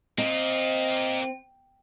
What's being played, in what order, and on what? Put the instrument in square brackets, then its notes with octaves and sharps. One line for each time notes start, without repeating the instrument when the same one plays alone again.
[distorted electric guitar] A#3 F4 [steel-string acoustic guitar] C4 [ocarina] D#5